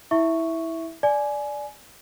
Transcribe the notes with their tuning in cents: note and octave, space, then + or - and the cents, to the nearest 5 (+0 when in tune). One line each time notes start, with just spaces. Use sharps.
E4 -15 E5 +0 C#6 +0
D5 +0 G#5 +20